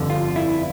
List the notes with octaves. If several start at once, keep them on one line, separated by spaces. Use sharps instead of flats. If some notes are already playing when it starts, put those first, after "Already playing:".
Already playing: G1 F2 D3
F4
E4